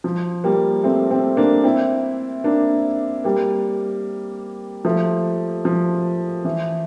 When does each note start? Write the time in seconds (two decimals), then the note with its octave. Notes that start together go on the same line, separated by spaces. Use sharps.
0.04 F3
0.44 G3 A#3
0.84 A3 C4
1.11 A3 C4
1.37 A#3 D4
1.64 C4 E4
2.44 A#3 D4
3.24 G3 A#3
4.85 F3 A3
5.65 F3
6.45 E3